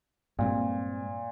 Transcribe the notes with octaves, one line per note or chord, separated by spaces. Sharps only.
G2 A#2 G#3 C4